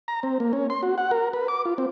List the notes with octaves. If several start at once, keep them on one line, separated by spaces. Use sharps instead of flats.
A#5
C4
A#3
C#4
C6
F#4
F#5
A#4
B4
D6
F4
C4